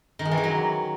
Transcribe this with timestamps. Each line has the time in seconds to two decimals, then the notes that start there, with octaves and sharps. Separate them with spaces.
0.19 D#3
0.25 G#3
0.31 E3
0.38 D#3
0.44 F#3